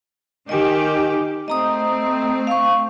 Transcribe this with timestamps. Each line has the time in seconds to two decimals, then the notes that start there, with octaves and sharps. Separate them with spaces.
0.49 D#3 G4 D#5 G#5
1.48 A3 C4 D#5 A#5 D#6
2.47 F5 C#6